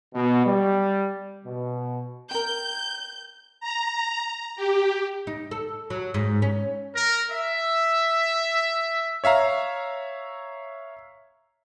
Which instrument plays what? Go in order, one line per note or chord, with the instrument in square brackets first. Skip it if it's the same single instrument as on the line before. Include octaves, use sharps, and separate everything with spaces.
[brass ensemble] B2
G3
B2
[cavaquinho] A#4 G5 [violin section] G6
[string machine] A#5
G4
[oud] D#4
A4
F#3
G#2
C#4
[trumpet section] A#4
E5
[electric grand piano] C#5 E5 F5 A#5